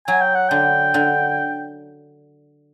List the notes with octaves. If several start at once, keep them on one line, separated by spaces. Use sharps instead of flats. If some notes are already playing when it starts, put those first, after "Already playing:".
F#3 G#5
G5
F#5
D3 G5
D3